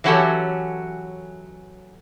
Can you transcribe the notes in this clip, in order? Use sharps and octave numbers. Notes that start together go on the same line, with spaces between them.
E3 F#3 C#4 F#4 G4 A4